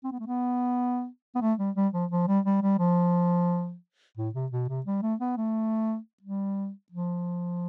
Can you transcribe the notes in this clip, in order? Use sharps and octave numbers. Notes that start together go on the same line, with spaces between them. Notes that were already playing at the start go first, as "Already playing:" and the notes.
C4
B3
A3
B3
B3
A3
G3
G3
F3
F3
G3
G3
G3
F3
A2
C3
B2
C3
G3
A3
B3
A3
G3
F3